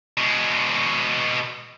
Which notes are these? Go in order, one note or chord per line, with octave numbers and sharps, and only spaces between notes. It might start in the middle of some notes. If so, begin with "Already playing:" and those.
B2 G#3